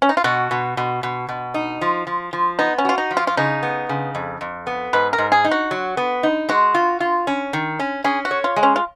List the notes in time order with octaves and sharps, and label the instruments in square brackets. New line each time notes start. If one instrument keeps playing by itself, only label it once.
[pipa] C#4
D#4
F4
[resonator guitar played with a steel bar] B2 [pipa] F#4
[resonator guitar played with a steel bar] B2
B2
B2
B2
D#4
F3
F3
F3
[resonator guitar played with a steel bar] B3 [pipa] D#4
[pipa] C#4
[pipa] F4 [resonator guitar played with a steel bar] F#4
[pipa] D#4
[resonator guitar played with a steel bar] F3
[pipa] F4
F4
[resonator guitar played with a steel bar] C#3 [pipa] D#4
[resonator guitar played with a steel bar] B3
C#3
F2
F2
B3
[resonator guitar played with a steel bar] G#2 [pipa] B4
[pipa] A#4
[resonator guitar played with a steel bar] G#2
[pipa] G#4
[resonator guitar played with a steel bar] D#4
[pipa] F#4
[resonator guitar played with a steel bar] F#3
B3
D#4
[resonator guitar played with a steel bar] G#3 [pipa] F#4
[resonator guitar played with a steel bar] F4
F4
C#4
D#3
C#4
[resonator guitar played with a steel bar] C#4 [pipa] G#4
[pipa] F#4
[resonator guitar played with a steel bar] C#5
[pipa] F4
[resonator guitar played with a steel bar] G#3
[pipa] C#4
F4